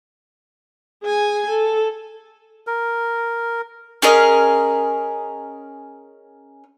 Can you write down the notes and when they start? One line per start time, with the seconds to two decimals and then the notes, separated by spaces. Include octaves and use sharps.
1.03 G#4 G#5
1.49 A4
2.67 A#4
4.02 C#4 G#4 A#4 D#5